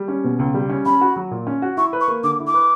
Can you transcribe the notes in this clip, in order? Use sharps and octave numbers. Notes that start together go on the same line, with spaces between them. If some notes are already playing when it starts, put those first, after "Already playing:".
Already playing: G3
C#4
B2
C#2
G3
C#4
C#4 B5
F#4
F#3
A#2
C#4
F#4
E4 C#6
B4
C#6
A#3
D3 D6
E4
D6
B4